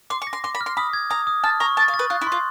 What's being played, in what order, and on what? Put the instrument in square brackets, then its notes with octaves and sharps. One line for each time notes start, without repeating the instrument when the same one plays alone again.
[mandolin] C6 [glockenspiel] D6
[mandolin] C#6
[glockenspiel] A#6
[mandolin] C6
[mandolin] C6 [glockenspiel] D6
[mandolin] B5
[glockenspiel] F6
[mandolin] C6
[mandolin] B5 [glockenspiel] D#6
[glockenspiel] G#6
[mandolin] A#5 [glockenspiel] D#6
[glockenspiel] D#6
[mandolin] A5 [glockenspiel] F6
[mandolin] A#5 [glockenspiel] C#6
[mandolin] A5 [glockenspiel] F6
[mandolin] F5
[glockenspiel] A6
[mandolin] B4
[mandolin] F4 [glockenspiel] F#6
[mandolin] E4
[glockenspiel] C6
[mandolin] F4